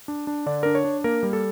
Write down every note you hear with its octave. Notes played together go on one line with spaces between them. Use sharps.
D4
D4
D3 D5
D4 A#4
C#5
D4
A#3 A#4
G3
A4